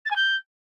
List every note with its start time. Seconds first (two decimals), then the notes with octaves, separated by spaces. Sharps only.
0.06 A6
0.11 G#5
0.16 G6